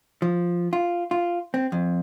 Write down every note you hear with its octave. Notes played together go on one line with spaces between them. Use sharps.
F3
F4
F4
C4
F2